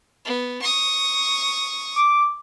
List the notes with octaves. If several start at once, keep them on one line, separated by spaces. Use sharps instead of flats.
B3
C#6 D#6
D6